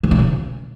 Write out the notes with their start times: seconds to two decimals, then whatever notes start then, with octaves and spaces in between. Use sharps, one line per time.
0.03 C#3
0.11 A#2
0.19 C#3